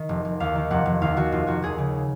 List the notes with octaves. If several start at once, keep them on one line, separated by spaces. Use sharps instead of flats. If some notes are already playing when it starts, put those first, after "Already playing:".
Already playing: D#3
F1
F1
D#2 F5
D#3
F1 F#5
F1
D#2 F5
D#3 F#4
F1 F4
F1 F#4
D#2 G#4
C#3